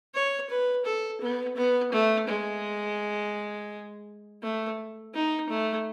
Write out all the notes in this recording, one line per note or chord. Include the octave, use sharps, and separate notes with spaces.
C#5
B4
A4
B3
B3
A3
G#3
A3
D#4
A3